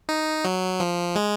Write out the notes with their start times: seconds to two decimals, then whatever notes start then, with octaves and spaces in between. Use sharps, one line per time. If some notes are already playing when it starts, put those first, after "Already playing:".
0.09 D#4
0.45 F#3
0.80 F3
1.15 G#3